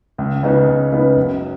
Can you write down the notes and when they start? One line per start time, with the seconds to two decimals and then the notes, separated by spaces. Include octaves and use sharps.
0.18 C#2
0.43 C#3 B3 D#4 B4
0.68 C#2
0.92 C#3 B3 D#4 B4
1.16 F#1